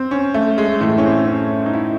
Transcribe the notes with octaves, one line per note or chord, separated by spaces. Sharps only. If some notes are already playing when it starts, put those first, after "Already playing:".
Already playing: C4
C#4
A3
G#3
A2 E3 A3
C#4
C4
C#4
D#4
E4